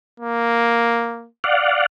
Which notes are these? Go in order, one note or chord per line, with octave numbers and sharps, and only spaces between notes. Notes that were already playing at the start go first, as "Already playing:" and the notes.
A#3
D5 F5 F#5